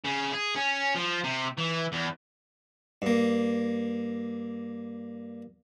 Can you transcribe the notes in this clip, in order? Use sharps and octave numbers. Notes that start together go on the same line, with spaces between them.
C#3
G#4
C#4
F3
C3
E3
E2
G2 A#3